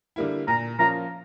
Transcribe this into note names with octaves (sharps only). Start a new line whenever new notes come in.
D3 G3 A#3 E4
A#2 A#5
F3 A#3 C#4 F4 A#5